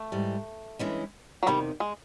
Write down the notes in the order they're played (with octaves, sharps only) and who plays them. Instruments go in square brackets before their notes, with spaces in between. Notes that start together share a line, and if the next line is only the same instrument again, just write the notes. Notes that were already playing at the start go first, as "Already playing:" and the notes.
Already playing: [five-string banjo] A3
[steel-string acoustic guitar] G#2 E3 G3
G2 E3 G#3 C#4 E4
[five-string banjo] F#3
[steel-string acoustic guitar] E2 C3 D#3 [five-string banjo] G3
[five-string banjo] G#3